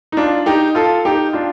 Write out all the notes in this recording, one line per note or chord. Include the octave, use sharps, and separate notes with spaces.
D#4
D4 F4
D#4 G4
F4 A4
D#4 G4
D4 F4